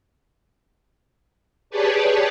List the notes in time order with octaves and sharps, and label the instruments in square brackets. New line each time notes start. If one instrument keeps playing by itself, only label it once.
[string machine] G4 G#4 B4 C#5 D5 A5